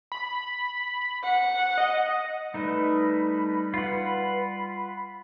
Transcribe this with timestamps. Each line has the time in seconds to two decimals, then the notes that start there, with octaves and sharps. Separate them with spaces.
0.12 B5
1.24 F#5
1.78 D#5
2.54 G3 A3 D#4 B4 B5
3.74 F4 F#5